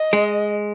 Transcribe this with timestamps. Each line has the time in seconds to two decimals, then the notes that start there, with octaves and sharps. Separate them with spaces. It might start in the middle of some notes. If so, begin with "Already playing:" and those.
Already playing: D#5
0.13 G#3